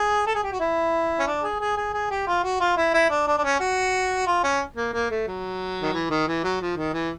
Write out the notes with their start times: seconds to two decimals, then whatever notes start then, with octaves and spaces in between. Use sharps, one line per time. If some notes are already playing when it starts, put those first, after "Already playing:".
Already playing: G#4
0.26 A4
0.35 G#4
0.43 G4
0.52 F#4
0.60 E4
1.19 C#4
1.27 D4
1.43 G#4
1.60 G#4
1.77 G#4
1.94 G#4
2.10 G4
2.27 F4
2.43 F#4
2.60 F4
2.77 E4
2.94 E4
3.10 D4
3.27 D4
3.38 D4
3.44 C#4
3.60 F#4
4.27 F4
4.43 C#4
4.76 A#3
4.93 A#3
5.10 A3
5.27 F#3
5.82 D#3
5.93 E3
6.10 D#3
6.27 E3
6.43 F#3
6.61 F3
6.77 D#3
6.93 E3